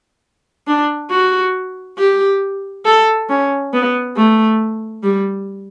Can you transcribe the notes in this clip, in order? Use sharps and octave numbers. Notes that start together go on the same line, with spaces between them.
D4
F#4
G4
A4
C#4
B3
A3
G3